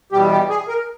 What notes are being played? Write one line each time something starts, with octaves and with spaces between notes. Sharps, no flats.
E2 B2 G3 G4
G4
G#4
A#4